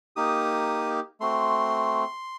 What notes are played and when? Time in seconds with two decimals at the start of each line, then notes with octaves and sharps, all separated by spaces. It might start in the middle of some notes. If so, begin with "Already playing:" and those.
0.16 A#3 D#4 G4 D#6
1.20 A3 C4 F#4 C6